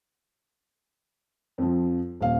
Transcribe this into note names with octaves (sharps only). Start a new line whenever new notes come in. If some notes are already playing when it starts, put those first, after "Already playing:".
F2 F3
D#1 F5